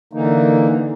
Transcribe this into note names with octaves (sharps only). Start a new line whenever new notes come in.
D3 E3 A#3 D#4